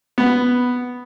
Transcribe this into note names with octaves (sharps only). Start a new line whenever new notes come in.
B3